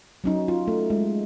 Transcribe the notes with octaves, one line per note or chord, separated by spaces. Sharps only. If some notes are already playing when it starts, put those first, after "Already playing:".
F#3 C#4 D#4
F4
A3
G#3